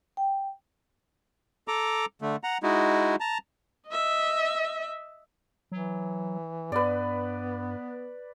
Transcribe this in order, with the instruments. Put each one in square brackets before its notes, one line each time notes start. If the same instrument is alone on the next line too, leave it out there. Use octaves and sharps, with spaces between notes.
[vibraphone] G5
[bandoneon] A4 A#5 D6
D3 A3
F#5 A#5
G#3 D#4 E4 F#4
A5 A#5
[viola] D#5 E5
[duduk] E3 [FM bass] F#3
[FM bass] G2 [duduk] B3 [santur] B4 D5